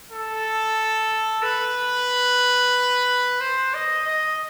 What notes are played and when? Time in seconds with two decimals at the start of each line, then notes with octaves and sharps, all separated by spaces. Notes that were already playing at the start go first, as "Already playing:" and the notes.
0.11 A4
1.43 B4
3.41 C5
3.74 D#5
4.07 D#5